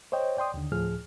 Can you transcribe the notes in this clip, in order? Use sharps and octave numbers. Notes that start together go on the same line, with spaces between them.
C5 C#5 D#5 G5
D5 G5 C6 D#6
D#2 D3
D2 A2 F3 G#4 F6